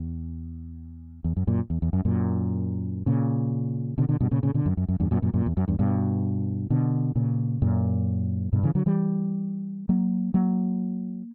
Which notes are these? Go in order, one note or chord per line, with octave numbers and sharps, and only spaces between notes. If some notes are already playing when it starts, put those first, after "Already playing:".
Already playing: E2
E2
F#2
F#2 A#2
E2
E2
F#2
F#2 A#2
A#2 C#3
B2 D3
B2 D3
G2 B2
A#2 C#3
A#2 C#3
B2 D3
F#2
F#2
F#2
E2 G2
F#2 A#2
F#2 A#2
F#2 A#2
E2
F#2
E2 G2
G2 B2
B2 D3
A#2 C#3
F#2 A#2
G2 B2
C#3 E3
D3 F#3
E3 G3
F#3 A#3
F#3 A#3